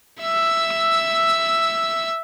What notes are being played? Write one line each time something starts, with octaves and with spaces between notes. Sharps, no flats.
E5 E6